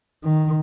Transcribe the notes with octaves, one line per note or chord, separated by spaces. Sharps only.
D#3